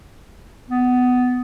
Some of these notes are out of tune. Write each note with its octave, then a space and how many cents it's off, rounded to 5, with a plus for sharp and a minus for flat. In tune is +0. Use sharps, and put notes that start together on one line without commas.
B3 +15